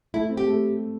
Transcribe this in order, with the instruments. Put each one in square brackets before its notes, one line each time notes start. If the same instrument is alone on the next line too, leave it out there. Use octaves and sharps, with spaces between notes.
[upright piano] A3 [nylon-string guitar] E4
[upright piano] C4
[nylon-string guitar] G4
[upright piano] A3